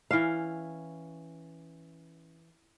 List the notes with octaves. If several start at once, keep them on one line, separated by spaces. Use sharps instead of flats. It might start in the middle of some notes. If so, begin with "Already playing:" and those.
E3 C#4 F5